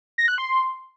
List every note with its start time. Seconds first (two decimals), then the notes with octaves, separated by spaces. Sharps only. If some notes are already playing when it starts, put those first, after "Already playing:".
0.18 A#6
0.28 F#6
0.38 C6